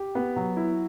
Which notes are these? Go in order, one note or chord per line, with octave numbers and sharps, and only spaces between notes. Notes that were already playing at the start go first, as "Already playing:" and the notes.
Already playing: G4
B3
F#3
E4